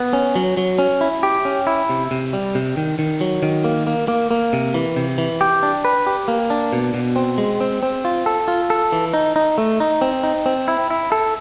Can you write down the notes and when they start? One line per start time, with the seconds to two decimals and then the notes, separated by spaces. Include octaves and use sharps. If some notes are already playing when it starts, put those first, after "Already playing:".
Already playing: B3
0.13 C#4
0.36 F#3
0.57 F#3
0.79 C#4
1.01 E4
1.23 G4
1.45 C#4
1.67 E4
1.90 C3
2.11 C3
2.33 G3
2.55 C3
2.77 D#3
2.99 D#3
3.21 F#3
3.43 D#3
3.64 A#3
3.87 A#3
4.08 A#3
4.31 A#3
4.53 C3
4.74 E3
4.96 C3
5.18 E3
5.41 G4
5.63 D4
5.85 B4
6.07 G4
6.28 A#3
6.50 D4
6.73 B2
6.94 B2
7.16 C4
7.38 G#3
7.61 C4
7.83 C4
8.05 F4
8.26 A4
8.48 F4
8.70 A4
8.92 E3
9.14 D#4
9.36 D#4
9.58 A3
9.80 D#4
10.02 C4
10.23 D#4
10.46 C4
10.68 E4
10.91 E4
11.12 A4